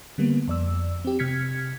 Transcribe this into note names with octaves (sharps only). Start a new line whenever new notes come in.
D3 G3 A#3 B3
F2 D5 E6
C4 G4
C3 F6 G#6 B6 C#7